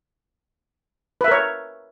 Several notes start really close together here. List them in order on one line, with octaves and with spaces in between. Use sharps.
B4 E5 A#4 C#5